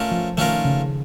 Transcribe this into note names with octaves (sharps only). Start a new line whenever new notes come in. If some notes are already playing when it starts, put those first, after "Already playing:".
Already playing: A3 C#4 F4 A#4
F3
D#3 A3 C#4 F4 A#4
C#3